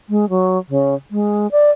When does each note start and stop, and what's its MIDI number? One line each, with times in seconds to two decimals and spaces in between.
0.09 0.29 56
0.29 0.58 54
0.69 0.94 49
1.11 1.50 56
1.51 1.70 74